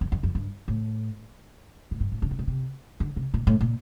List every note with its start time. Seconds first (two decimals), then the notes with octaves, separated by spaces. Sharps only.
0.01 F2
0.12 F2
0.23 F2
0.35 G2
0.68 A2
1.91 A2
2.00 G2
2.12 A2
2.22 D3
2.31 C3
2.39 A#2
2.47 C3
3.00 D3
3.16 C3
3.34 A#2
3.47 A2
3.61 A#2